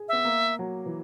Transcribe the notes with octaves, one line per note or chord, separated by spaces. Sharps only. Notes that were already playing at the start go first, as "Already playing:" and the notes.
Already playing: G#4
B3 E5
A#3
F#3
E3